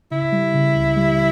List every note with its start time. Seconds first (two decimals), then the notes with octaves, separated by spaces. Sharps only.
0.11 C#3 E4
0.32 G3
0.54 C#3
0.76 C#2
0.97 G3